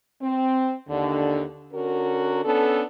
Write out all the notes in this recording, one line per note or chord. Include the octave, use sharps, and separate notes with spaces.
C4
D#2 D3
D3 C#4 F#4 A#4
B3 C#4 D4 A4